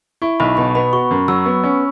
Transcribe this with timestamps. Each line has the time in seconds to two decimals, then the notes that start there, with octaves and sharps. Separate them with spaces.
0.22 E4 C#6
0.40 B1 B5
0.57 B2 B5
0.75 B3 B5
0.93 F#4 C#6
1.11 F#2
1.28 F#3 E6
1.46 B3
1.64 C#4